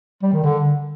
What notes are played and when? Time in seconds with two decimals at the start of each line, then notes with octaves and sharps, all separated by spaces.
0.23 G3
0.33 D#3
0.43 D3